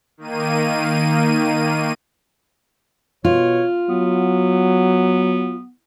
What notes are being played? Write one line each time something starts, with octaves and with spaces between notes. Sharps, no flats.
D#3 A#3 D#7
B2 F4 C#5
F#3 B3